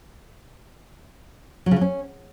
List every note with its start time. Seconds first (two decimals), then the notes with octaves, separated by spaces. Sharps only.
1.66 F#3
1.71 C#3
1.76 F#3
1.81 C#4